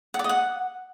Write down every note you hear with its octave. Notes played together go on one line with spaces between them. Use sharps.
F#5
D5
D#5
F#5